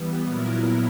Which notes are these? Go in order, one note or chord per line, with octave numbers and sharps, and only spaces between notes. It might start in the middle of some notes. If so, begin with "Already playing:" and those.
Already playing: E3 G3 B3
A#2 F#3 B3 E4 A#4